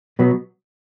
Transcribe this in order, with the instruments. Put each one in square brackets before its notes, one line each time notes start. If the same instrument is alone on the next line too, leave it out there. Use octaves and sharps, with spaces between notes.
[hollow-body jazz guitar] B2 F#3 B3